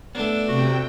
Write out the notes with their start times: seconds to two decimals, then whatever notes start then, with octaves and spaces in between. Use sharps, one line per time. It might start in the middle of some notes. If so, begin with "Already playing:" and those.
0.15 A3 B3 D4 A4
0.48 C3 F#4 G5